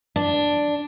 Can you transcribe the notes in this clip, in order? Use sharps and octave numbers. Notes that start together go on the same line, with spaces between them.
D4